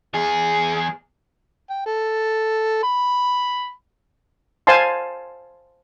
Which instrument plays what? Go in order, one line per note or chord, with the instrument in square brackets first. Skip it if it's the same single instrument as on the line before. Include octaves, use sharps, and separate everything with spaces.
[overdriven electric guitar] E2 G#4
[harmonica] G5
A4
B5
[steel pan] C5 F5 G#5 A5 C6